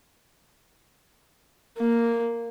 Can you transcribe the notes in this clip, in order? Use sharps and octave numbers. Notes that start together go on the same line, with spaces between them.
A#3